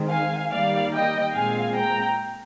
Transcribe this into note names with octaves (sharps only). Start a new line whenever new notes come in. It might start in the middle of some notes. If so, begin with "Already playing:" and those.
Already playing: D#3 G#3 C4
F5 G#5
D#3 G3 A#3 D5 F5
D#5 G5
A#2 G#3 C4 F5 G#5
G5 A#5